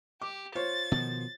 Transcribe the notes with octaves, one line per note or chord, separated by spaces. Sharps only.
G4 D6
F4 C5 C#5 A6
B2 D#3 F3